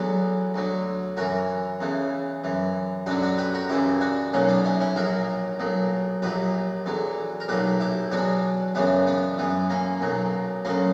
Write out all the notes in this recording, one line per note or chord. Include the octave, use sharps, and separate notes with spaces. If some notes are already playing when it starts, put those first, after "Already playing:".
Already playing: E2 D3 F#3 B3
D2 D3 F#3
F#2 E3 F#4 A#4
E2 C#3 E3
F#2 E3
F#2 D3 F#3 D4 F#4
D4 F#4
G4 B4
F#4 A#4
F#2 C#3 E3 E4 G4
D4 F#4
B1 A#2 F#3 A#3 C#4
B3 D4
C#4 E4
C#4 E4
A#1 A#2 F#3 F#4 A#4
B1 A#2 F#3
A#1 A#2 F#3 G4 B4
E2 D3 F#3
A#4
B1 A#2 F#3 G4 B4
E4 G4
E2 B2 F#3 D4 F#4
F#2 C#3 E3 B3 D4
B3 D4
F#2 E3 B3
A#3 C#4
B1 A#2 F#3
D2 C#3 F#3 A#3 C#4